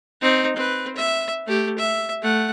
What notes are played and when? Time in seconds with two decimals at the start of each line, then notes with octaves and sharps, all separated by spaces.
0.22 C4 D#4
0.56 C4 B4
0.96 E5
1.47 A3 G4
1.79 E5
2.22 A3 F#5